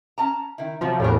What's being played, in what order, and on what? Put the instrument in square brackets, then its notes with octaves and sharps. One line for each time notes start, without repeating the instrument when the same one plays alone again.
[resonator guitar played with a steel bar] C#4 A5 A#5
D#3 E4
[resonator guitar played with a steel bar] C3 F#3 [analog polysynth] F3
[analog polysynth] E2 A2 [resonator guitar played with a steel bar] F#4 G4 A#4